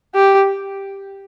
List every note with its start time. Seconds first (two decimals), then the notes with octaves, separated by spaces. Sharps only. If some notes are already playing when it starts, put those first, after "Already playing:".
0.15 G4